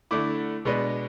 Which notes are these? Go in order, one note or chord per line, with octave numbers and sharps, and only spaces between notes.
D3 A3 E4 D6
B2 G#3 B3 D4